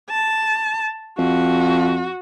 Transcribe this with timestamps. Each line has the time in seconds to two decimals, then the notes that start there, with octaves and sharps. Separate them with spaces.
0.10 A5
1.19 F2 F#4